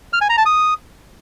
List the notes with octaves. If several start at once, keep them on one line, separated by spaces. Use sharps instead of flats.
F6
G#5
A#5
A5
D#6